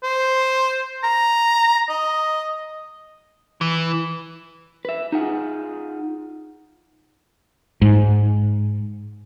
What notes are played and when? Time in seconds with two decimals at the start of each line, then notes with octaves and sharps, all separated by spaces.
0.04 C5
1.04 A#5
1.89 D#5
3.61 E3
4.85 B4 E5
5.12 D#4 F4 G#4 F#5
7.82 G#2